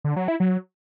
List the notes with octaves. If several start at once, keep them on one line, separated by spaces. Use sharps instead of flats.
D3
F#3
E4
F#3